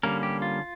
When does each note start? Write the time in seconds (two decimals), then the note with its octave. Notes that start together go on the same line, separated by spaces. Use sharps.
0.03 D3 G3 A#3 C#4 A#4
0.23 G4
0.42 F4